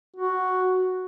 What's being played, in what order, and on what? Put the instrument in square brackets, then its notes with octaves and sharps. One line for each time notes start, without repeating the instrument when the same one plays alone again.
[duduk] F#4